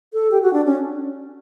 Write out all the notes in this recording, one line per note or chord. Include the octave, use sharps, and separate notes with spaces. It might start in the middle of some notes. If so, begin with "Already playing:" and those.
A4
G4
F#4
D4
C#4